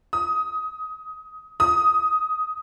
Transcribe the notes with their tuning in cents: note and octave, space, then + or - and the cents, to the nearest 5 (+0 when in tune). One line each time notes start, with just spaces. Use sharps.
D#6 +20
D#6 +10